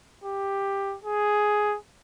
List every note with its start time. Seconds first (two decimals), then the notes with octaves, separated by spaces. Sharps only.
0.24 G4
1.04 G#4